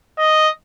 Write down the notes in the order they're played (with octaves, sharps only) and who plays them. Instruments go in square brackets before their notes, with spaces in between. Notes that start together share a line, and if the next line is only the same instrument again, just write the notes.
[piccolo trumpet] D#5